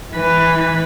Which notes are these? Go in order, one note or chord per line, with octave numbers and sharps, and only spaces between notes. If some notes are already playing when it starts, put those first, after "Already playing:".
E3 B4